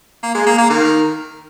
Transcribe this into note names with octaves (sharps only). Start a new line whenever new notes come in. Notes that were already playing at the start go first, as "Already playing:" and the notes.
A#3
G#3
A#3
A#3
D#3